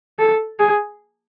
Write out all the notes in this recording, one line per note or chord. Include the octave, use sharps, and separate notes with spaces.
A4
G#4